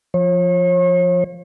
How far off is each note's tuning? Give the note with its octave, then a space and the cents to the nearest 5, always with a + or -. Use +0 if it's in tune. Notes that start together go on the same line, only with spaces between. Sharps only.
F3 +0 C#5 -40